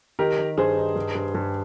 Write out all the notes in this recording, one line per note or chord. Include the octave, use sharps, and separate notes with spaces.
D#3 G4 A#4
D#3
G2 G#4 C5
D#4
G2
G2
G2